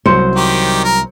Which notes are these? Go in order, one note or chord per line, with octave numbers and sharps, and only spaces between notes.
C2 F#3 C5 C#7
D#3 G4
A#4